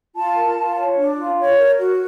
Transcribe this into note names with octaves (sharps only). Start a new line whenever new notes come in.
F4 A5
A#4
F4
C#5
D4
F4
C#5
A#4
F#4